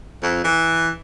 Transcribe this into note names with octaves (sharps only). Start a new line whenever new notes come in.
F2
E3